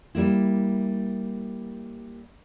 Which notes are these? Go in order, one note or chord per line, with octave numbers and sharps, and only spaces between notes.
G3 A#3 E4